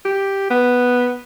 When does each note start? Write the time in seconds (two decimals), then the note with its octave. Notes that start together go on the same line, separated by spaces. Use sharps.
0.05 G4
0.50 B3